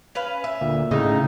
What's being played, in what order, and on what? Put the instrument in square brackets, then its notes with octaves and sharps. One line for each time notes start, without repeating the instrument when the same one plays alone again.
[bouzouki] C#4 B4 F5
E5
[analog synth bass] D2 [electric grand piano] A#2
[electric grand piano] A2 [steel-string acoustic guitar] C#3 [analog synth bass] D#4